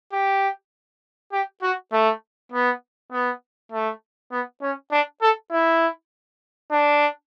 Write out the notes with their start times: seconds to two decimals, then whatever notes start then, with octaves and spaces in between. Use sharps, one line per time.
0.13 G4
1.32 G4
1.62 F#4
1.92 A3
2.52 B3
3.12 B3
3.72 A3
4.32 B3
4.62 C#4
4.92 D4
5.22 A4
5.52 E4
6.71 D4